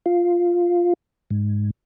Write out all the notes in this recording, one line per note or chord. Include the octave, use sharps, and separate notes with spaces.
F4
G#2